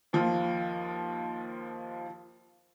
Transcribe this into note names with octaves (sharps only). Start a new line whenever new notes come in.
D#2 F3 F4